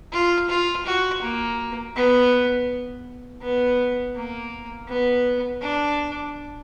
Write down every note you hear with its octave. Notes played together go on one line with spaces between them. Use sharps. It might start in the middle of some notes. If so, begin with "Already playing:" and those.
F4
F4
F#4
A#3
B3
B3
A#3
B3
D4